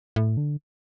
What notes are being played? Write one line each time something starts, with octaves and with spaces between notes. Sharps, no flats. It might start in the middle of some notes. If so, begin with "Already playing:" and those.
A2
D3